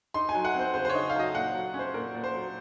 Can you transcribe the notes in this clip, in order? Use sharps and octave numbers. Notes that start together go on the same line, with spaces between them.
D#4 C6
G#5
F#3
F#5
C4 C5
C#3 C5
C5
D#4 C#5
F5
F#3 D#5
A#2 F#5
F#3
C#4
C5
A#2 A#4
A#2
C5
F#3